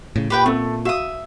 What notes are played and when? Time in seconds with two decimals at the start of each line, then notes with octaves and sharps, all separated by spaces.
0.16 A2 C#3
0.30 A#2 G4 B4 G5
0.46 A3 B3 C4 A4
0.85 F#4 E5 F5 D#6